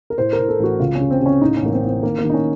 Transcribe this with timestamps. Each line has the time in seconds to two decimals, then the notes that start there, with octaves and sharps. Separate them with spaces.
0.10 A#4
0.18 A2 C5
0.33 A#4
0.39 A2
0.48 A4
0.59 A1 F#4
0.80 C#2 F4
0.95 C#4
1.01 C#3
1.11 C4
1.21 C#3
1.26 C#4
1.41 A2 D#4
1.57 C#4
1.62 A1 A#3
1.73 C4
1.82 A1
1.88 C4
2.03 D#3 A#3
2.19 A#3
2.24 D#3
2.30 D#4
2.34 C#4